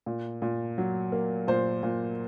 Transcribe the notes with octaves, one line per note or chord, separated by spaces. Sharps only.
A#2
A#2
F#3
A#3
A#2 C5
A#2